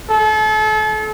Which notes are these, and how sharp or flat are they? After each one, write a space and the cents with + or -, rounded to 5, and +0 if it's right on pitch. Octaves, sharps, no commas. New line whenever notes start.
A4 -35